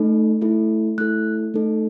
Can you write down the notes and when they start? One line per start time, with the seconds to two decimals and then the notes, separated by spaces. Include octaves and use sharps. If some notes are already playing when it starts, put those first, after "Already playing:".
Already playing: A3 D#4 A4
0.41 A3 E4 A4
0.98 A3 E4 A4 F#6
1.54 A3 D#4 A4